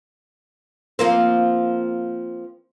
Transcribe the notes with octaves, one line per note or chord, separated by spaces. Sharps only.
F3 A#3 C4